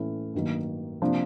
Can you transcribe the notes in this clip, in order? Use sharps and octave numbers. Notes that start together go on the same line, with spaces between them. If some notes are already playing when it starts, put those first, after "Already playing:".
Already playing: A2 E3 A3 C#4 E4
G2 D#3 F#3 A#3
C3 F3 A#3 D4